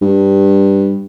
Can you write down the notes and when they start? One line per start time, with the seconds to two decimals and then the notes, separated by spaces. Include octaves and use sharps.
0.02 G2